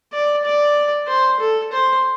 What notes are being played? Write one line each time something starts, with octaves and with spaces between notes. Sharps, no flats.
D5
D5
C5
A4
C5